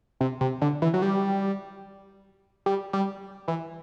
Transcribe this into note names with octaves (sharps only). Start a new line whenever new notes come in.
C3
C3
D3
E3
F#3
G3
G3
G3
E3